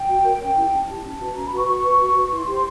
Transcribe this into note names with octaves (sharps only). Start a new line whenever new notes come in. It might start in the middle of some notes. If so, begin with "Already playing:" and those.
Already playing: G5
F#4
A#4 C#5
C#4
E4 G4
C#4 A5
E4 G4 A5
C#4
F#4 B4
C#4 A#5
B5
F#4 B4 C#6
F#4 C#6
B4
F#4
B4
E4 C6
G4 C5